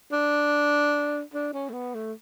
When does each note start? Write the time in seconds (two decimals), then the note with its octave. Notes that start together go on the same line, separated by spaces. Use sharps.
0.12 D4
1.34 D4
1.53 C#4
1.70 A3
1.73 B3
1.95 A3